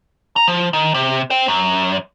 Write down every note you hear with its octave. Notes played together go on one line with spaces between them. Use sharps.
A#5
F3
D#3
C3
C5 G5
F#2